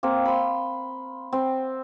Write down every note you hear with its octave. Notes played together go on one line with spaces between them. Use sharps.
A#3 C4
B5 C6
C4